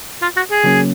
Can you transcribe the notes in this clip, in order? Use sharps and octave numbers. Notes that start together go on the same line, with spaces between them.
F4
F#4
G#4
C#3 F#3 A#3 C#4